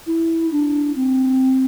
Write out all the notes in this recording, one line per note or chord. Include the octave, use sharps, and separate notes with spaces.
E4
D4
C4